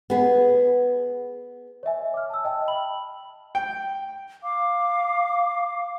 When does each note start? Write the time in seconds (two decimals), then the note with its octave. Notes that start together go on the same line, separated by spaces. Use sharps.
0.10 B3 G#4
1.83 C#5 D#5 E5 G#5
2.14 D6 F6
2.30 A5 E6
2.45 D#5 G5 A5
2.68 B5 F#7
3.55 G5
4.43 F5 D6